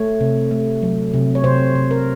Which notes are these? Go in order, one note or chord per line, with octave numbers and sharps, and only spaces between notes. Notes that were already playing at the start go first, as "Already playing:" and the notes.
Already playing: A3 C#5
C3
A3
F#3
C3
C#5
C3 C5
C3
A#4